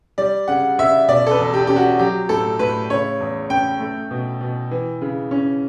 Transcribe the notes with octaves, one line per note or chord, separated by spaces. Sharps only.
G3 D5
C#3 F#5
C#3 E5
B2 D5
A4
B4
E2
G4
C#4 G4
F#4
F#3 G4
A2 A4
A2 B4
C#3 C#5
E2
C#4 G5
A3
B2
B2
E3
C#3
C#4